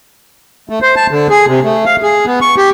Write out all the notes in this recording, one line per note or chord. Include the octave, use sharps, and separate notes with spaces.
A3
C5
A5
D3
G#4
C3
A3
F5
G#4
B3
C#6
G4